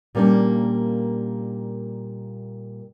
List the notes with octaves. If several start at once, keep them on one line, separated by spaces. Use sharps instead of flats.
A#2 G3 A#3 C#4 D4